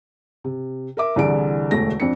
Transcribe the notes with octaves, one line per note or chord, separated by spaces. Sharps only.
C3
A#4 E5 D6
C2 D3 E3 G#4 D5 D7
E1 D2 A3 A#6
F2 C4 D4 C#7